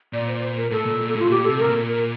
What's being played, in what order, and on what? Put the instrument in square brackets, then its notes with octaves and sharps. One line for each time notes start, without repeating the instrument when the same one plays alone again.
[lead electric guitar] A#2 [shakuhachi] D5
[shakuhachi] C5
C5
A#4
[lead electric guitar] A2 [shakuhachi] A4
[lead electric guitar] A#2
A#2
A2
[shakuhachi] F4
[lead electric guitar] A2
[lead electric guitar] A#2 [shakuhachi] G4
[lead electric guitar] C3 [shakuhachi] A4
[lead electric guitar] A2 [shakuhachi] A#4
[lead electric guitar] A#2
[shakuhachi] A#4